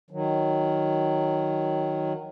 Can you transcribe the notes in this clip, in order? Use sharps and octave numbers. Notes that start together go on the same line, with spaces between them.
D#3 F#3